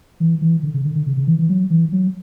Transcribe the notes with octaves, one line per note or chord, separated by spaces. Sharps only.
E3
E3
D3
C#3
D3
D3
C#3
C#3
E3
E3
F#3
E3
F#3